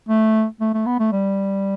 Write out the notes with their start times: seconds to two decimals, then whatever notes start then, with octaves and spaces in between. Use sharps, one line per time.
0.09 A3
0.61 A3
0.74 A3
0.86 B3
0.99 A3
1.12 G3